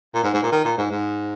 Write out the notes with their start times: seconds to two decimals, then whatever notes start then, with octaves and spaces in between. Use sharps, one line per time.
0.14 A#2
0.23 G#2
0.33 G#2
0.43 A#2
0.52 D#3
0.64 A#2
0.77 G#2
0.91 G#2